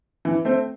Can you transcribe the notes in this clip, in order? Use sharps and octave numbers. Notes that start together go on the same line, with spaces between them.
E3
A3 C4